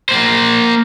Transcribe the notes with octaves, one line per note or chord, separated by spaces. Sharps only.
A#3 C5